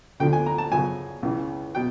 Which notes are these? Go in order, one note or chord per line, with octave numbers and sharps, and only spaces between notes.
D2 D3 F3 G5
G#5
A#5
A5
F#2 C#3 F3 G#5
C#2 C#3 E3
B2 G5